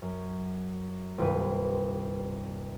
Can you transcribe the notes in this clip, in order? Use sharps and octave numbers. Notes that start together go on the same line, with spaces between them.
F#2
D#1 C2 G2 B4 D#7